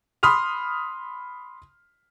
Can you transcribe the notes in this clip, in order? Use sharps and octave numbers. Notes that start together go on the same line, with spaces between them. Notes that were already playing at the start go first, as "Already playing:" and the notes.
B5 C6 D#6 F6 F7